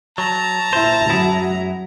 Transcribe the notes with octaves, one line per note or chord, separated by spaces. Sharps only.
F#3 A5 A#5
A#2 E4 C5
F#2 F#3 E4 G#4